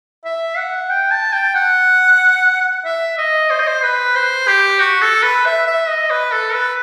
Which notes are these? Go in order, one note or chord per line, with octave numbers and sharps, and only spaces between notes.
E5
F#5
G5
A5
G5
F#5
E5
D#5
C5
D#5
C5
B4
C5
G4
F#4
A4
B4
E5
E5
D#5
B4
A4
B4